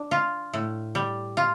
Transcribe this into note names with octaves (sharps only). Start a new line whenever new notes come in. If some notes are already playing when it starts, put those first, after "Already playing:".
Already playing: D4
F4
A2
G3
F4